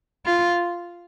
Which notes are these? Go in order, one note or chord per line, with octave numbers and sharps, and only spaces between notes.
F4